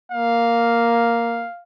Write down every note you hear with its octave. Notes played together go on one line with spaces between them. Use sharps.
A#3 F5